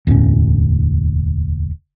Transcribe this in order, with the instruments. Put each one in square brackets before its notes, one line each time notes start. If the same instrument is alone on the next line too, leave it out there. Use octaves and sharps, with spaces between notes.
[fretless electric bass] E1 D2 A2 C#4